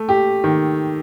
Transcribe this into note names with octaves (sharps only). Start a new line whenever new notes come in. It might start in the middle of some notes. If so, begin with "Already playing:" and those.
Already playing: A3
G4
D#3